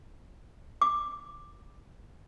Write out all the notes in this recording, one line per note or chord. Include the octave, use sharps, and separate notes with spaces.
D6